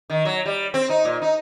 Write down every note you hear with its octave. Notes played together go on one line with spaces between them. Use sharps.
D#3
F#3
G3
C4
D#4
A#2
D#4